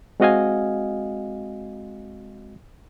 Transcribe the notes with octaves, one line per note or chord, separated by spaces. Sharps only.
G#3 C4 F#4 D#5 F5 G#5